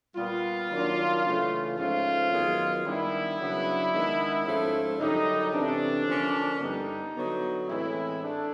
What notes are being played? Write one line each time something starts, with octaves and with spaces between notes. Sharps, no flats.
A#2 G3 B3 F4
D#3 F#3 A#3 D4
C#3 E3 A3
G#2 F3 A3 C#4 F4
F#2 D#3 G#3 B3
D#3 G3 B3 D4 E4
C#3 F#3 B3 D4
D#3 G#3 B3 D4
G#2 F3 A3 C#4
F#2 D3 G3 D#4
C3 E3 A3 C#4 D4
D3 F3 A#3 C#4
G2 D3 G3 B3 D4 D#4
D3 F#3 B3
A2 E3 G#3 C4 E4
A3 D4